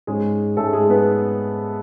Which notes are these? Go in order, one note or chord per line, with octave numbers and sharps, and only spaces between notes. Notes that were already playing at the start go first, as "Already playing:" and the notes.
G#2 G#3 C#4 G#4
G#2 G#3 A3 C#4 A4
G#3 G#4
B3 B4